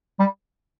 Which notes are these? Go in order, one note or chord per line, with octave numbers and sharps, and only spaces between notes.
G3